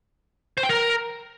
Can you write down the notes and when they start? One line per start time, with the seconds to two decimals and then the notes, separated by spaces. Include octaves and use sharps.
0.58 C5
0.63 G5
0.69 A#4